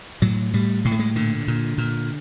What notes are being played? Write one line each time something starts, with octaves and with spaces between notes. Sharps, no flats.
A2 F#3
A2 G3
A2 G#3
A3
G#3
A#2 D3
A#2
A#2